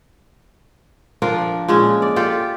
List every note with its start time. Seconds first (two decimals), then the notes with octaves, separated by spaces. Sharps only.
1.22 F3 D4 A#4
1.68 A#2 G#3 C#4
2.02 D5
2.16 F4 G4 A4